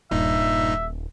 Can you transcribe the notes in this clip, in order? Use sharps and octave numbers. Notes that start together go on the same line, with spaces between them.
D#1 G2 A#2 D#4 E5